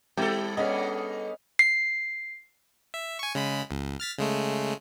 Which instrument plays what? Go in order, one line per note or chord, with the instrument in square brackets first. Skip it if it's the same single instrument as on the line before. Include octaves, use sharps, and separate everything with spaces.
[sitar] G3 A4 [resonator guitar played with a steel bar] C4 E4 [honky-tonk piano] G4
[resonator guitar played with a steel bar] B3 D4 G#4 [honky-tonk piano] C#4 D#5
[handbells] C7
[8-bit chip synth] E5
G#5 C#6
C#3 G#3 B5
C#2
F6 A6 B6
C#3 G#3 A3